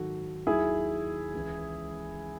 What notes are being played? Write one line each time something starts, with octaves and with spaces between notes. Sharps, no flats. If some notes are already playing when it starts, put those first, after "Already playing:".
Already playing: G#2 D#3 F#3 F#4 A4
D#2 D#3 F#3 E4 G#4
C#2 C#3 E3